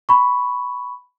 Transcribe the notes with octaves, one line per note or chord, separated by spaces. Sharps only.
B5 C#6